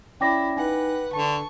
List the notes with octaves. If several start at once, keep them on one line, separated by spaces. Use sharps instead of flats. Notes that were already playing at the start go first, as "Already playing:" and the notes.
C#4 E4 D5 G5 D6 A#6
D#4 B4 F#5 G#5
D3 A5 C#6